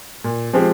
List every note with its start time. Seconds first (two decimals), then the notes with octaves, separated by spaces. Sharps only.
0.24 A#2
0.53 F3 G#3 C4 G4